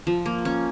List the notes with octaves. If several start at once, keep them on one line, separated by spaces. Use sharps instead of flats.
F3
A#3
C#4